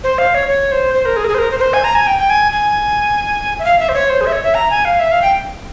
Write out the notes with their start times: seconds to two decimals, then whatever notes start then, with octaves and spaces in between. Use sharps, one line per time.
0.04 C5
0.18 F5
0.35 C#5
0.48 C#5
0.72 C5
0.94 C5
1.05 A#4
1.17 G#4
1.24 A#4
1.28 G#4
1.34 C5
1.39 A#4
1.51 C5
1.58 A#4
1.61 C5
1.74 G#5
1.84 A#5
1.95 G#5
2.07 G5
2.18 G5
2.30 G#5
2.52 G#5
3.59 E5
3.65 F5
3.79 E5
3.89 C5
3.94 C#5
4.10 C5
4.21 G#4
4.26 E5
4.32 C#5
4.43 E5
4.55 A#5
4.70 G#5
4.85 F5
5.00 E5
5.12 F5
5.22 G5